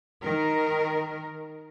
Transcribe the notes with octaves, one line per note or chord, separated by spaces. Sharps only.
D#3 A#4